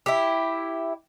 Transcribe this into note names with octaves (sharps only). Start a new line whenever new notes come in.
E4 G4